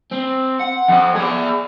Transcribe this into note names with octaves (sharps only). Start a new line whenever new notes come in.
C4
F#5
F2 C4
G#4 D5